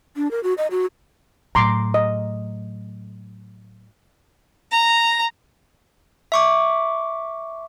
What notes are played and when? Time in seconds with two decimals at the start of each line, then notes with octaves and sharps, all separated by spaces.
0.17 D4
0.31 A#4
0.43 F#4
0.58 D#5
0.71 F#4
1.55 A2 F#3 A#5 C6 D6
1.94 D#5
4.71 A#5
6.32 E5 C#6 D6